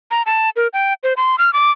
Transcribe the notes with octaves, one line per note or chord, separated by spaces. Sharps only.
A#5
A5
A#4
G5
C5
C6
F6
D6